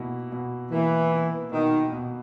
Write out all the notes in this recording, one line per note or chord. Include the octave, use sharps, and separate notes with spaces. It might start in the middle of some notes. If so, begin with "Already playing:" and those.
Already playing: B2 A#3 E4
B2
E3 A#3
E4
B2 D#3
B2